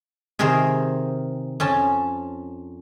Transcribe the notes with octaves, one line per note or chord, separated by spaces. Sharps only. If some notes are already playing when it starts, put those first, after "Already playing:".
C3 D#3 G#4 A#4 C5
F2 C#4 A5